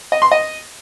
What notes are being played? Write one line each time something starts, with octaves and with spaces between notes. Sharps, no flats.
D#5
C6
D#5